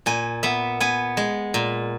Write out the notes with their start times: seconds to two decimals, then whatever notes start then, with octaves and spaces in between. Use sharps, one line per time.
0.06 A#2 G#5
0.43 B3 E5
0.80 B3 G#5
1.17 G#3
1.54 A#2